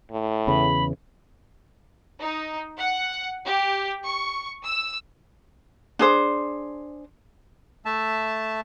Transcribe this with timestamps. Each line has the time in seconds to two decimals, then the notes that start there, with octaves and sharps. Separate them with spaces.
0.11 A2
0.47 E2 C#3 E3 B5
2.20 D#4
2.77 F#5
3.45 G4
4.05 C#6
4.65 E6
5.99 D4 G#4 C5
7.85 A3 E5 A5